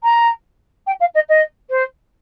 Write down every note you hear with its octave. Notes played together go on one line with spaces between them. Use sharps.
A#5
G5
F5
D#5
D#5
C5